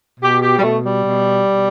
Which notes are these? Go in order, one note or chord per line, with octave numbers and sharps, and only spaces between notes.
B2 G4
G4
G3
B2 A3
G3
B2
B2